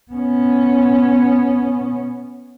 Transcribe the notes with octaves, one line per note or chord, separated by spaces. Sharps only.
B3 C#4